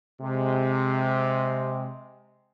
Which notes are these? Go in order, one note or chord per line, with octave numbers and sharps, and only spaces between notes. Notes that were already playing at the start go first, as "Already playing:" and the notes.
C3 G#3